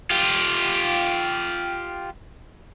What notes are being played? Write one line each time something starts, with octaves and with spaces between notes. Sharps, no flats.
F4 G4